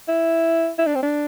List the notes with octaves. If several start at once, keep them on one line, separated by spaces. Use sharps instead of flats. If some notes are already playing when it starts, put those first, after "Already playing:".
E4
E4
D4
C4
D4